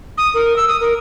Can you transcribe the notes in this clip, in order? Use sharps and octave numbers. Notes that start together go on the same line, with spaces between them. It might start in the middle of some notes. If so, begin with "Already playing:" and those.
D#6
A#4
E6
D#6
A#4